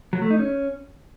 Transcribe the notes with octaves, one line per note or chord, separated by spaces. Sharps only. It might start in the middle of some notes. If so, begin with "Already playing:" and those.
F#3
A3
D#4
C#4